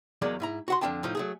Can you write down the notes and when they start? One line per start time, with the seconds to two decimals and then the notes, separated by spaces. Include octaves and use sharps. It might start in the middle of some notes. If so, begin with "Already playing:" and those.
0.22 E2 F#3 G#3 A#3 D5
0.40 G#2 E4 A#5
0.68 F#4 F#5 C6
0.81 F2 D3 G#3 D4 G5 A5
1.03 A2 F3 D#4
1.15 F#3 A3 G#4